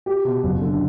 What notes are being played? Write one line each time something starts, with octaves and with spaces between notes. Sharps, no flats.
G4
B2
F#1
D3